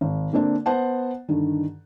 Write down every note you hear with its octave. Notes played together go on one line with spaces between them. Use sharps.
G#1
D3 A#3 C4 D4
B3 C5 F#5 A5
G2 D3 D#3